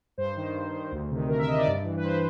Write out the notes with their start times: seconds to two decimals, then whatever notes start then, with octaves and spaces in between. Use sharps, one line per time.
0.18 G2 C5
0.36 D#3
0.54 G2
0.72 D#3
0.92 D2
1.11 C3 D#3
1.29 D2 A#4
1.38 E5
1.47 C3 D#5
1.52 D#3
1.57 D5
1.67 G2
1.84 E3
1.96 B4
2.03 G2 C5